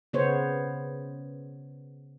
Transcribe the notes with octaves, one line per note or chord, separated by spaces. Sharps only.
C#3 B3 C5 C#5